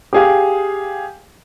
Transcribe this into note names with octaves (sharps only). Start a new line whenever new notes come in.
G4 G#4 F5